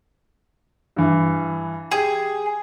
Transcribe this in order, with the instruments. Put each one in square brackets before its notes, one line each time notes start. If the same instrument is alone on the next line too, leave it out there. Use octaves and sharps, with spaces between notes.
[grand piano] G2 E3
[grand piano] G4 [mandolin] G#4